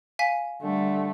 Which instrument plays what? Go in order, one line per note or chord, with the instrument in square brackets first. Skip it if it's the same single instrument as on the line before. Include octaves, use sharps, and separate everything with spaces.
[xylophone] F5 G#5 B6
[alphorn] D3 [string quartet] G3 A3